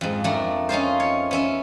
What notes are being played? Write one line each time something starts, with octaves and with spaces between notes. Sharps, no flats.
F2 G#2
F2 A3 D4 A#4
C#4 D#4 F4 C5
C#5
B3 C#4 E5